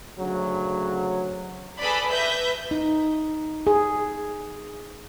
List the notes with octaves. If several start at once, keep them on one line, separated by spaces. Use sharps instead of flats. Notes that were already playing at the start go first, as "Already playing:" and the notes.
D2 C#3 F#3
G#4 A4 B4 D5 B5
B4 E5 G6 A#6
D#4
G#4